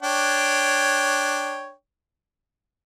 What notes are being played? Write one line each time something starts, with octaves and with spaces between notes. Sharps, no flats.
D4 C#5 G5